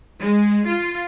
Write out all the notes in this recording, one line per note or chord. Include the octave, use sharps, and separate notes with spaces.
G#3
F4